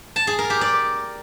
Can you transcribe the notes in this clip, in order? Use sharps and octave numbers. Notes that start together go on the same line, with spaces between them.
A5
G#4
A#4
G4
D5